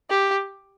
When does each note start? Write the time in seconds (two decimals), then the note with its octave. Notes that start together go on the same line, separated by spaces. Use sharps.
0.09 G4